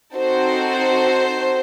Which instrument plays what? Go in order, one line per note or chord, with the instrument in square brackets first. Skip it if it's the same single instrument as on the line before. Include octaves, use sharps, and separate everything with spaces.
[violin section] C4 D#4 F#4 A4 C5